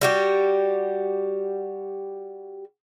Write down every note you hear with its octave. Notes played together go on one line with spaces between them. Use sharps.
G3 F#4 G4